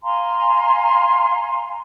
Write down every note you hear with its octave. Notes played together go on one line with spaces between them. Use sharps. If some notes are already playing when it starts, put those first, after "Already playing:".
F5 G#5 A#5 C6